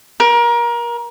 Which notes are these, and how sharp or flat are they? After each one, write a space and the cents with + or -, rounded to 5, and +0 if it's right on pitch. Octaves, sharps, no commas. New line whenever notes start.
A#4 +25